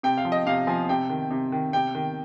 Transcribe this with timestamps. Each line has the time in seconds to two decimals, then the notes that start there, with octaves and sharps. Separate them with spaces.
0.03 C3 G5
0.17 F5
0.25 F3
0.32 D#5
0.46 C3 F5
0.67 F3 G#5
0.89 C3 G5
1.10 D#3
1.31 C3
1.52 D#3
1.73 C3 G5
1.95 D#3